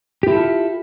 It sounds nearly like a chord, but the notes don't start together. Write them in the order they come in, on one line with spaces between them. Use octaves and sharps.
G4 E4 A4 F4